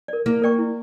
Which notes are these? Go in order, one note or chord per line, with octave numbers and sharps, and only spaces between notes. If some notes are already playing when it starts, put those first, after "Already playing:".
A#4 D5
A#3 E4
A#4 D5 G5 C#6
E4